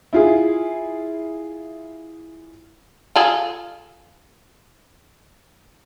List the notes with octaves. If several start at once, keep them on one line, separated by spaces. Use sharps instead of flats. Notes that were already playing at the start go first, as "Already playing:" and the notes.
E4 F4 G#4
F4 G#4 A4